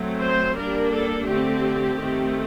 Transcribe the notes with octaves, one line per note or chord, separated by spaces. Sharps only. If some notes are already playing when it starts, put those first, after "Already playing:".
Already playing: F#3 A3 C4
C5
G3 A#3 D4 A#4
A4
D3 A3 C4 G4
D#3 A3 C4